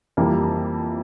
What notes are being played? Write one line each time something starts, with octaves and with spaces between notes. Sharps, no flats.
F2 E3 G3 A#3